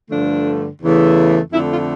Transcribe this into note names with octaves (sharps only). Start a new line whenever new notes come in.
G2 D3 F3 A3 D4
E2 C#3 E3 A3
F2 D3 A3 E4
F4